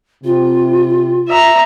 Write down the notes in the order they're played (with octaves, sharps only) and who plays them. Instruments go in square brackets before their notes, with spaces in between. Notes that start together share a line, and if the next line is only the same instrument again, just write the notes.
[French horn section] C3 [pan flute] F4
[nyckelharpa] E5 A#5